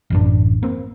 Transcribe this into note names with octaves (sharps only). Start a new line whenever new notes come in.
A1 F#2 D4
A#3 C4